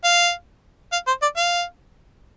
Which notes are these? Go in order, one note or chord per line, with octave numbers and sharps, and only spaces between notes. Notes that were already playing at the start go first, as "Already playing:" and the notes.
F5
F5
C5
D5
F5